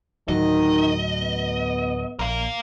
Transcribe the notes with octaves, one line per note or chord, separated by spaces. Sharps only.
D2 A2 D#3 F#3 D#5
B3
A#1 A#4 F5